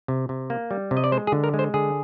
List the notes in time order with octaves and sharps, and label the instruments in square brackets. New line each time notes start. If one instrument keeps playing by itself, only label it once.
[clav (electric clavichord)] C3
C3
A#3
G3
C3
D#5
D5
G#3 C5
G#4
D3
A#4
G#3
C5
D3 G#4